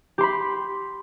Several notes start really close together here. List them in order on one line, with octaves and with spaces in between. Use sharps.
G4 C6 B5